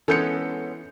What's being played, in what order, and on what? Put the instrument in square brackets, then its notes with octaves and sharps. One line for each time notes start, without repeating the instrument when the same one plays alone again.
[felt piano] E3 G6 C#7 [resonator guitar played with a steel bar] G#3 B3 C#4 [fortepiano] A4